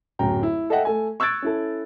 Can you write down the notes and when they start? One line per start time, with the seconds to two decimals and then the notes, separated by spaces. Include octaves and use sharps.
0.19 D1 F#2 G5 A#5
0.43 E4
0.70 A4 D#5 E5 F#5 G5
0.85 A3 A4 G#5
1.20 C#6 E6 F#6 G#6 A6 D7
1.42 C#4 E4 A4